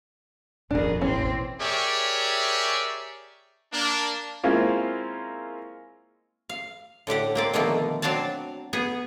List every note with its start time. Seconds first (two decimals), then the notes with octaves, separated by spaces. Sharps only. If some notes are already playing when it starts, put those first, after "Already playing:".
0.71 D#1 G#1 F2 B2 D4 G#4 A#4
1.01 E1 A1 E3 A#3 C4 C#4
1.60 G4 G#4 A#4 C#5 D5 E5
3.73 A#3 D4
4.44 G#3 A#3 C4 C#4 E4 F4
6.49 F5
7.07 A2 D3 G4 F#5
7.35 A#3 C4 D5
7.53 B2 D3 D#3 F3 A3 A#3
8.02 F#3 C4 D4 F#4 F5 A5
8.73 B3 G#4